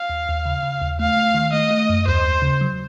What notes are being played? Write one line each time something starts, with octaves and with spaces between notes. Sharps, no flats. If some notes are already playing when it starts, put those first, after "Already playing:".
Already playing: F5
D#2
D#2
C#3
C#3
D#2
A3 F5
A3
D#3
A3 D#5
A3
F#2
D#2 C5
D#2
C#3
F#3